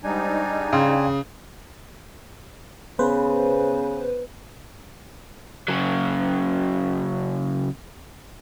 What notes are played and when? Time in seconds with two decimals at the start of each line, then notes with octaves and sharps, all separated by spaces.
0.03 G#2 G3 D4 D#4 G#5
0.73 C#3 F5 G5 C6
2.99 C#3 B3 B4 C5
5.68 C#3 F#3